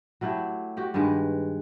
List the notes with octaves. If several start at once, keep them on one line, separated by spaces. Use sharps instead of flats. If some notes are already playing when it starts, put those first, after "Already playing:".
F#3 A3 E4 G4
F#4 G4 G5
G2 D#3 G#3 B4